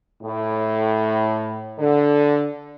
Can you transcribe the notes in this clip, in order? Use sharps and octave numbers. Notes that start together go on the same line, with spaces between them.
A2
D3